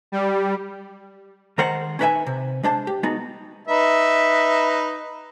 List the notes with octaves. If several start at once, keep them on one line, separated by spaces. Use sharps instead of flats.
G3
D#3 G#3 A#4 C5 D#5 F#5
C#4 D#4 B4 C#5 E5 G#5
C3
G#3 D4 C5 A5
G4
G#3 B3 D#4 F#4
D#4 B4 E5